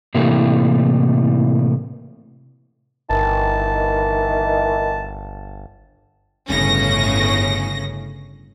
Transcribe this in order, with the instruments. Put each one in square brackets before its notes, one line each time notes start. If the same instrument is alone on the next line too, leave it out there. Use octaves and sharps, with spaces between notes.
[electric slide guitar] A2 C3 E3 A3 A#3
[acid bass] G1 [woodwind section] D#3 E3 [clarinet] A5
[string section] G1 A2 C#3 C#4 A#6